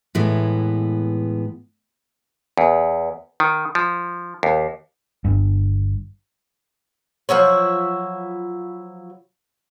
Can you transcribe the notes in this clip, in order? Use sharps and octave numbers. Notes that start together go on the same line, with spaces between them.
A2 E3 G#3 B3
E2
D#3
F3
D#2
G1 G2
F3 F#3 E4 C#5